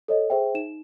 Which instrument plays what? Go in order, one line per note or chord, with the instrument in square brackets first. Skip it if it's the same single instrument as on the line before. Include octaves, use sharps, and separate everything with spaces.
[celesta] A4 C#5 D#5
G#4 C5 E5 G5
D#4 E7